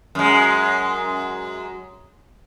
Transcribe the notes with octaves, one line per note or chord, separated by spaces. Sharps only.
F#2 G#3